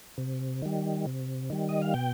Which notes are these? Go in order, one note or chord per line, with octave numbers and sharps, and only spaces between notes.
C3
D#3 G3
C3
D#3 G3
D#5
F5
B2 G5